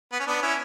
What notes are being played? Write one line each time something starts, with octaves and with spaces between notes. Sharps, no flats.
B3
C#4
B3 D4
C#4 E4